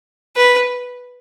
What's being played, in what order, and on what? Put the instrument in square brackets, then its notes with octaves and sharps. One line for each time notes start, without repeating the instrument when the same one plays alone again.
[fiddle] B4